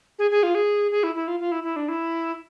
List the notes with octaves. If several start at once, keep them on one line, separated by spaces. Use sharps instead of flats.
G#4
G#4
F4
G#4
G#4
E4
E4
F4
F4
E4
E4
D4
E4